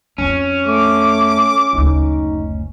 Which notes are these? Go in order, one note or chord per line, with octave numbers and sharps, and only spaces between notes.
F2 C#4 D#4
A3 D6
F#1 D2 D#4